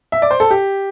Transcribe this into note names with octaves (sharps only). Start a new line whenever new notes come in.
E5
D5
C5
A4
G4